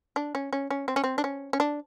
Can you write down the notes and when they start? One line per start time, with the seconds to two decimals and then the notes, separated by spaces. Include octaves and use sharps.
0.16 D4
0.35 C#4
0.53 C#4
0.70 C#4
0.88 C4
0.96 C#4
1.04 C4
1.18 D4
1.24 C#4
1.53 C#4
1.60 D4